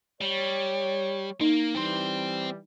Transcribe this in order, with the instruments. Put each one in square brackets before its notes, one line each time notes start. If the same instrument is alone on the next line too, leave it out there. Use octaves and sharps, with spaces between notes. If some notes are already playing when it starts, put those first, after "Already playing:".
[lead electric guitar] G3 [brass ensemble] C#5
[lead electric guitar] A#3 [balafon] D#4
[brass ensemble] E3 G3 [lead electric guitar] C4 C5